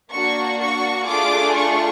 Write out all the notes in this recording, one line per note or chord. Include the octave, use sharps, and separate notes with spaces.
A#3 D4 F#4 C#6
C#6
A3 D4 F4 G#4 D6
C#6